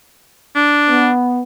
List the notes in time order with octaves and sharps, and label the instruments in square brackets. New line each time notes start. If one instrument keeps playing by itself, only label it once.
[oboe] D4
[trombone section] B3